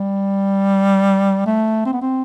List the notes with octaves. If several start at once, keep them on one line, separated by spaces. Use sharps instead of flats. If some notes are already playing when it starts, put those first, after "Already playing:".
Already playing: G3
A3
C4
B3
C4